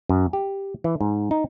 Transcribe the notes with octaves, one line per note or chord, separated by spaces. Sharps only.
F#2
G4
E3
G#2
D#4